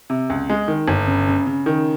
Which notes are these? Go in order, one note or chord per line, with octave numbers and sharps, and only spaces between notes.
C3
C#2
G#3
D#3
G1
C#3
C#3
C#3
D#3